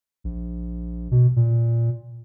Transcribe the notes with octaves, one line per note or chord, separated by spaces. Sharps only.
A#1
B2
A#2